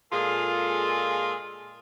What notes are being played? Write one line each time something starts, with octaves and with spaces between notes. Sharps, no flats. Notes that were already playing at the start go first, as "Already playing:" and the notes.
A#2 G#3 F4 G#4 A4